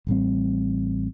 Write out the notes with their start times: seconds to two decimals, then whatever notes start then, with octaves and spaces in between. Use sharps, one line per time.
0.07 A1 A2 G3 C4